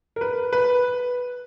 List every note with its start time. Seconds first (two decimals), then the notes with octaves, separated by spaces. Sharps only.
0.16 A#4
0.21 B4
0.53 B4